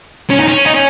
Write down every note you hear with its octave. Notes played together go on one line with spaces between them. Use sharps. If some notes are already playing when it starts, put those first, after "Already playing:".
C#4
D#4
C#4
D#4
C#4